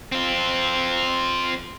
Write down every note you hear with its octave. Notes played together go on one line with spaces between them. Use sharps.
C4 F4